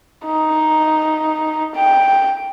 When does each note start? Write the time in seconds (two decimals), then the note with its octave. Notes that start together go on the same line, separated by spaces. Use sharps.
0.26 D#4
1.75 G5